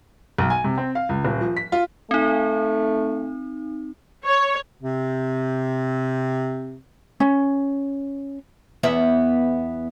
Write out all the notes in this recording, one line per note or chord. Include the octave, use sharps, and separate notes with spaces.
B1
G#5
C3
C4
F5
C#2
D#1
F3
B6
F4
A3 C4 D#4
C#5
C3 C4
C#4
E2 B3 E5